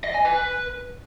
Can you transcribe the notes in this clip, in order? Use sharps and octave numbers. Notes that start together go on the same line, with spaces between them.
D#5
G#5
B4